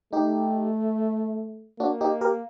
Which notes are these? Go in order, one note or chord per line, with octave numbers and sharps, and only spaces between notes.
A3 D#4 G4
A#3 D4 F#4
D#4 G4
G4 A#4